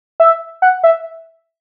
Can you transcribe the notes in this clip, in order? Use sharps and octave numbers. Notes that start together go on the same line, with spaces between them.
E5
F#5
E5